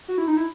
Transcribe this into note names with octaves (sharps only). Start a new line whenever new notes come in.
F#4
E4
D#4
E4